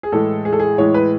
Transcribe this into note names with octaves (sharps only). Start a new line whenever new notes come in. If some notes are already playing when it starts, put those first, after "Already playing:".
G#4
A2 E3 G#3 A4
G#4
A4
G#4
A2 E3 G#3 C#5
B4